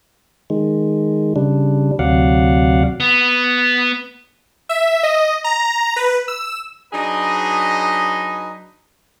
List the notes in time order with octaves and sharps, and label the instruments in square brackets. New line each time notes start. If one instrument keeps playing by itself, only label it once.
[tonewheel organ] D#3 G#3
C#3 G3 D4
D2 C3 F#3 D5 F5 F#5
[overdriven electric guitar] B3
[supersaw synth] E5
D#5
A#5
B4
E6
[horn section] F#3 D4 D#4 G#4 B4 D#5